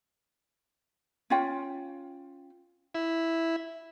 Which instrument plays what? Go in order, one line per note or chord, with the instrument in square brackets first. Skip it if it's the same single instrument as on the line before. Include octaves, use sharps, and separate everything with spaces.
[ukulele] C#4 F4 G5
[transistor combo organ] E4